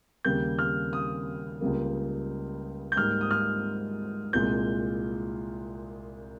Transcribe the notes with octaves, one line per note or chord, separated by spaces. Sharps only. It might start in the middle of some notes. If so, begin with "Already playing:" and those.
D#2 C#3 G3 A#3 G6
F6
D#6
C#2 C#3 G3 A#3
G6
G#2 G3 A#3 F6
D#6
F6
C2 A#2 G#3 G6